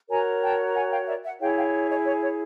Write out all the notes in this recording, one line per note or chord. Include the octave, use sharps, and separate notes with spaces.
F#4 A#4 C#5 G#5 A#5
G5 A5
F#5 G#5
F5 G5
D5 E5
E5 F#5
E4 G#4 C#5 F5 G5
F5 G5
C#5 D#5
C#5
C#5